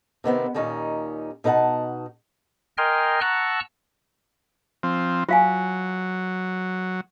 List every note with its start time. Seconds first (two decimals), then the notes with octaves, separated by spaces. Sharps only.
0.24 C3 D#3 B3 C4
0.54 D#2 A#2 D#3 C#4 D#4
1.44 B2 D#4 A#4 E5 F#5 A5
2.78 A#4 D#5 G5 G#5 C6 F6
3.21 F#5 A5 A#5 C#6 E6 F#6
4.83 F3 C4
5.29 F#3 F4 F5 G#5